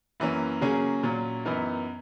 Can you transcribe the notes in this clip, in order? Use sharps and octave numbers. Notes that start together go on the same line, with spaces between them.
F#2 E3 A#3 C#4
C#3 F#3 A#3 C#4 G#4
A#2 F#3 C#4
F#2 E3 B3 D#4 A#4